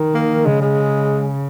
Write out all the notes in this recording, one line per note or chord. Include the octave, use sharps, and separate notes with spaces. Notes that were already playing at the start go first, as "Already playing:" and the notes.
Already playing: D#3
A#3
C#3 G#3
G#3